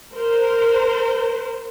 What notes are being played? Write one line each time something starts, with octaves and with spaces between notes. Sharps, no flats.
A#4 C5